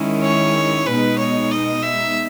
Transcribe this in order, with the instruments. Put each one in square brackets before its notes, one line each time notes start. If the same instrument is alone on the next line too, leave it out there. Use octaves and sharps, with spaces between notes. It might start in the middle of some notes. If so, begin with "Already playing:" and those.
Already playing: [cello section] D#3 G#3 C#4 E4
[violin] C#5
[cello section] B2 G#3 D#4 [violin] B4
[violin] C#5
D#5
E5